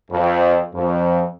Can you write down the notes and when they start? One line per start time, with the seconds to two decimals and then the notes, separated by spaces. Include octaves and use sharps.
0.10 F2
0.73 F2